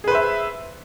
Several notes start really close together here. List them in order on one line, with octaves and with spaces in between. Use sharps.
G#4 B4 C5 E5